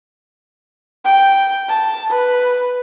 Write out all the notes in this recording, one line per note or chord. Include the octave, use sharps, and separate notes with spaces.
G5
A5
B4